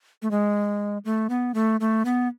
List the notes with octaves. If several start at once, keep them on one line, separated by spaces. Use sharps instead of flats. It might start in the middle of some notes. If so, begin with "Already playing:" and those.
A3
G#3
A3
B3
A3
A3
B3